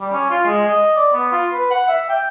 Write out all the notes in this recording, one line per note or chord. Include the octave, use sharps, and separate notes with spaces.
G3
C#4
F4
G#3
D#5
D5
B3
F4
B4
F#5
E5
G5